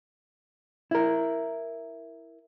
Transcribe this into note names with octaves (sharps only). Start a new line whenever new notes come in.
E4 A#4